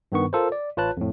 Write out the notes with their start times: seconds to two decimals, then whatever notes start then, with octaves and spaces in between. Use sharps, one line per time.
0.12 G2 D#3 B3 C#6
0.33 F4 A4 A#4 C5
0.52 D5
0.77 A1 F4 B4 C#5 A5 F#6
0.97 F2 A2